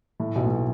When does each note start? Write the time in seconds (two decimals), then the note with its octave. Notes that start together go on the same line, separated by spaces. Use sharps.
0.20 A2
0.35 B1 B2
0.46 A2
0.51 B2